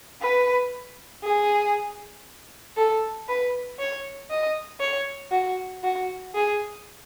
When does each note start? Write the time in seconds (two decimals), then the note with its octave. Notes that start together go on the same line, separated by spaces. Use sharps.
0.21 B4
1.23 G#4
2.77 A4
3.28 B4
3.79 C#5
4.30 D#5
4.80 C#5
5.32 F#4
5.83 F#4
6.34 G#4